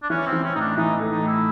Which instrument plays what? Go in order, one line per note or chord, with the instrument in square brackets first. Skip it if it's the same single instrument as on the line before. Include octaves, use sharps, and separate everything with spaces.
[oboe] D4
[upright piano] E3 [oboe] C#4
[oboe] C4
[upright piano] E3
[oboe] C#4
[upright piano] A2 [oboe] D4 D#4
[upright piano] E3 [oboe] D#4
[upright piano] A3
[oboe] D#4
[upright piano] A2
[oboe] E4